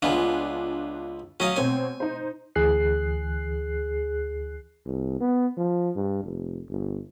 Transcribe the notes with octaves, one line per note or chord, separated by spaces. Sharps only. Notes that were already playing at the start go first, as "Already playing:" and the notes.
C#2 B3 D4 F4 G#5
F#3 C#4 D#5 F5
B2 C4 C#5 G#5
D#4 C5
D2 E3 G#4 F#6 C7
C2
B3
F3
G2
F1
G1